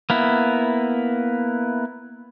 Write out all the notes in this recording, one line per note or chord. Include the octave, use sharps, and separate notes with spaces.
A#3 B3 E4